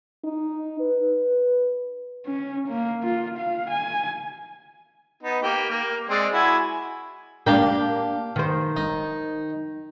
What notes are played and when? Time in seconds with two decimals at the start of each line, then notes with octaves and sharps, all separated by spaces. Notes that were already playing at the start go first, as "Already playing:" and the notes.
0.24 D#4
0.80 B4
2.26 C#4
2.68 A#3
3.03 F4
3.38 F5
3.70 G#5
5.23 B3 D#4
5.42 A#3 G4
5.70 A#3
6.09 G#3 C4 D5
6.33 E4 F#4 G#5
7.46 A#3 D4 G4 F5 G5
8.36 D#3 C5
8.76 D#4